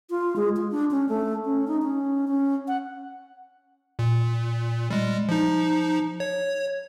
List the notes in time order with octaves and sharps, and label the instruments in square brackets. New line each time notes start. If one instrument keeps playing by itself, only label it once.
[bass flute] F4
G#3
F4
D4
C#4
A3
C#4
D#4
C#4
C#4
F#5
[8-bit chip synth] A#2
G3 G#3
F3 D#4
C#5